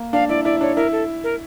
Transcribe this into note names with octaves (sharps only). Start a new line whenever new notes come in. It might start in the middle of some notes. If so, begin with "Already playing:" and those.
Already playing: A#3
D4 F5
E4 D5
E4 D5
D4 C#5
E4 A#4
A4
A#4